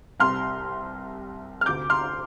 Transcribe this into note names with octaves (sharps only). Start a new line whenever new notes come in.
C2 C3 C6 F6
F6
D2 C3 D6 G6
C6 F6